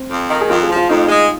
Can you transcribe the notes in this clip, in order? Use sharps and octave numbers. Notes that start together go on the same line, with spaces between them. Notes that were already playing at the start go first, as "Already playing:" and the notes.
Already playing: C4
F2
D#3
G#4
F2 F4
G#4
F3
F4
F2 D#4
G#3